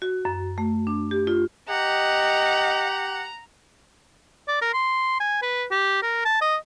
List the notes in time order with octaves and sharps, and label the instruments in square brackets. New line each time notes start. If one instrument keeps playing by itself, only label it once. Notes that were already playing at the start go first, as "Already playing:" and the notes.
[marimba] F#4
F#2
A3
D4
G4
F4
[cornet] G4 [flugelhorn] D#5 [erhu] F#5 [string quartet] A#5
[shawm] D5
A#4
C6
G#5
B4
G4
A#4
A5
D#5